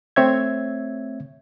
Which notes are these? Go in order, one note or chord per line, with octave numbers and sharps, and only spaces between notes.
A3 C4 C#5 E5 G#6